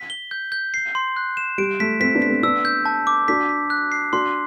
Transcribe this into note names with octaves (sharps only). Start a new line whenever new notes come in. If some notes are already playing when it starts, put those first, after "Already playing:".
Already playing: B6
G7
G6
G6
C7
C6
F#6
E7
G3 D7
A3 B6
A3 C4 B6
B3 D4
B6
A3 C4
B3 D4 E6
G6
A5
D6
D4 F#4 B6
B6
F#6
C7
D4 F#4 C6